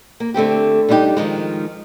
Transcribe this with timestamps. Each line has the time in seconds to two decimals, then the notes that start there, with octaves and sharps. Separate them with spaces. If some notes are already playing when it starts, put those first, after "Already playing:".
0.20 A#3
0.34 D3 A3 C4 G4
0.89 G3 D4 D#4 F4 G4
1.17 D#3 F3 G#3